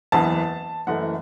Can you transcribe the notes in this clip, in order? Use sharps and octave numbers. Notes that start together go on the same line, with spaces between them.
F#1 E2 E3 B3 A5
F#1 F#2 E3 A3 F#5